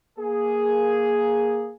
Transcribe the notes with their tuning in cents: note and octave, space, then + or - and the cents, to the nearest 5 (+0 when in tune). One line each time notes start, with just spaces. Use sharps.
A#3 +0 G#4 +0